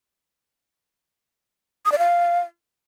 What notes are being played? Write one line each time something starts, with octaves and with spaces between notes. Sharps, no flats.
D#6
D5
F5